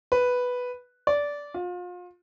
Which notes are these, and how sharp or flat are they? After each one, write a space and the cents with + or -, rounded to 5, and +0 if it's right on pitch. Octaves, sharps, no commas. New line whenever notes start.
B4 +0
D5 -15
F4 +35